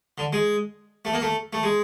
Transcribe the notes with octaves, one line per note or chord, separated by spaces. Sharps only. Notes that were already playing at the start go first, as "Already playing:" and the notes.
D3
G#3
A3
A#3
A3
A3
G#3